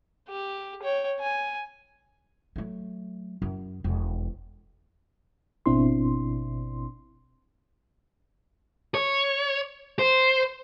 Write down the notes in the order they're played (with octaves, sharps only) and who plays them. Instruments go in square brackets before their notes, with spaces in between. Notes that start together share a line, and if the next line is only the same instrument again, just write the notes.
[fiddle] G4
C#5 G5
G#5
[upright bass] F#3 A3
F#2 E4
E1 F2
[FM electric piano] G#1 B2 C4 D4 E4 C6
[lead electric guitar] C#5
C5